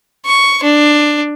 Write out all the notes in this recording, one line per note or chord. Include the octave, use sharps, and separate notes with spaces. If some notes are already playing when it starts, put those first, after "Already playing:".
C#6
D4